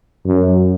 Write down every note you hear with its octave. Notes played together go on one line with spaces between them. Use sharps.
F#2